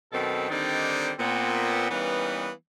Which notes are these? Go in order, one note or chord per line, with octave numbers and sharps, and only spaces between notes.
F#2 B2 D#3 C4 A4
D3 D#3 G3 C4 D4 D#4
A#2 B3 C4
E3 G3 A#3 B3 C#4 D#4